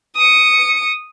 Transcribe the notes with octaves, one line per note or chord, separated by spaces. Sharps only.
D#6 C#7